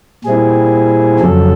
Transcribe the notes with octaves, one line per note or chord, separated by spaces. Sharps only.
A#2 G3 C4 E4 G#4
F2 C#3 F#3 A4